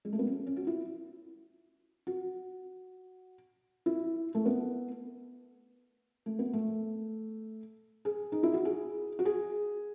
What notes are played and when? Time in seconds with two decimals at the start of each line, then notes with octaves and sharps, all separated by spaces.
0.05 G#3
0.13 A3
0.19 B3
0.27 C#4
0.47 C#4
0.57 F#4
0.67 E4
2.07 F#4
3.86 E4
4.35 A3
4.46 B3
6.26 A3
6.39 B3
6.53 A3
8.05 G#4
8.32 D#4
8.43 E4
8.53 F#4
8.65 G#4
9.19 F#4
9.25 G#4